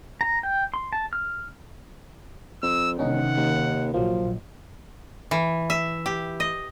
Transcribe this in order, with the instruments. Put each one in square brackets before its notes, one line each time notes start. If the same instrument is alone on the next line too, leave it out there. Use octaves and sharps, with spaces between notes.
[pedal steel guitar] A#5
G5
C6
A5
F6
[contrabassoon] F2 [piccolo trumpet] E6
[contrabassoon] E1 [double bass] C3 D#3 [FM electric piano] C#4 D#4 [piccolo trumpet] F#5
[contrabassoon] D#2
[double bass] A#1 [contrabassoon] F3 [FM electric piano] F#3 A#3
[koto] E3
E5
G4
D#5